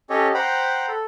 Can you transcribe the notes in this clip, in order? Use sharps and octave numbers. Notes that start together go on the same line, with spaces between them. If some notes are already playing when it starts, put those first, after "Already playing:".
C#4 G4 A4 C#5 D#5
C5 F#5 G5 A#5 B5
A4